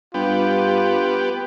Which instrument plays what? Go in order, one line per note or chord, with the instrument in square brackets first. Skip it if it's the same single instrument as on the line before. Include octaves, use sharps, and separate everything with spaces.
[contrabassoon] G2 [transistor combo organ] B3 G4 [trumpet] F4